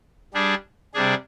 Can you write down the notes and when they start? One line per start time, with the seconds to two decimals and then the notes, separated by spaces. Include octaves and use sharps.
0.34 G3 D4 G#4
0.94 C3 G3 D4 G#4